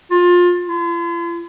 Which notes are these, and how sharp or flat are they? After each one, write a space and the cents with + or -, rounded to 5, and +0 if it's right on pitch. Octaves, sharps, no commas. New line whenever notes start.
F4 +25
F4 -45